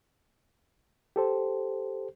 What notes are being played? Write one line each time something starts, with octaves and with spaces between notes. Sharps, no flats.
G4 A4 C5